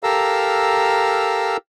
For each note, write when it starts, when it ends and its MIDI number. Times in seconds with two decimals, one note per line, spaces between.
0.03 1.57 67
0.03 1.57 69
0.03 1.57 70
0.03 1.57 77
0.03 1.57 82
0.03 1.57 88